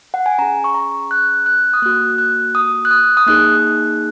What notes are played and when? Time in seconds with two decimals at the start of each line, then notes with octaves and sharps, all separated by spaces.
0.14 F#5
0.26 G#5
0.39 C#4 G#4 A#5
0.64 C#6
0.74 A#5
1.11 F#6
1.46 F#6
1.73 D#6
1.82 A#3 F#4 F#6
2.18 F#6
2.55 D#6
2.85 F#6
2.91 D#6
3.17 D#6
3.27 A#3 D#4 G#4 F#6